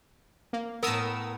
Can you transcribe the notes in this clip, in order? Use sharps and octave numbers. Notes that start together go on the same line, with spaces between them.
A#3
A2 B3 A#4 D#6 E6